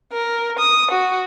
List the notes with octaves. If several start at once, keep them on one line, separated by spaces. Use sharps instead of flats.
A#4
D#6
F#4